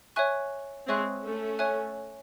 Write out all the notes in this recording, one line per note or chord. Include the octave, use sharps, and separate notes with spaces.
C#5 E5 G#5 C#6 F#6
G#3 C4 C#5 E5 G#5 C#6 F#6
A3 C#4
C#5 E5 G#5 C#6 F#6